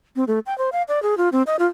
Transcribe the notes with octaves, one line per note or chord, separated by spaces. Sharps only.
C4
A3
G5
C5
F5
D5
G#4
F4
C4
D#5
F4